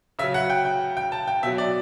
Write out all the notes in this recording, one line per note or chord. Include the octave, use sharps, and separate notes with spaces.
C#3 F#3 E5
F#5
G5
G5
G5
A5
G5
B2 F#3 E5
D5